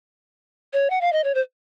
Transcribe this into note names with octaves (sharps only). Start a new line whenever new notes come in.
C#5
F#5
F5
D#5
C#5
C5